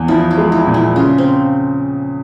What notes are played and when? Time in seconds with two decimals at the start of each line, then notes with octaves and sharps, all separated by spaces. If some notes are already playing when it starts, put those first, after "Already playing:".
Already playing: E2
0.08 F3 E4
0.31 E4
0.38 G#3
0.52 E4
0.67 A#2
0.74 E4
0.96 C#3 F4
1.18 C4